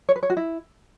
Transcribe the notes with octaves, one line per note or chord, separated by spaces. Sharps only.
C#5
B4
C#5
F#4
E4